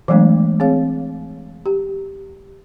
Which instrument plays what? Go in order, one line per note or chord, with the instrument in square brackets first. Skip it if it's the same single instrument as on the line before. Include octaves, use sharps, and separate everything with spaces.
[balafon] E3 F#3 G#3 A3 B3 D4
C4 G#4 C#5 F5
G4